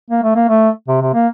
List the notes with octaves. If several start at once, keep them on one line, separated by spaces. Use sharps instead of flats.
A#3
A3
A#3
A3
C3
C3
A#3